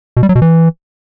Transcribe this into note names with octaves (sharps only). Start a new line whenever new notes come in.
B2
G3
F#3
B2
E3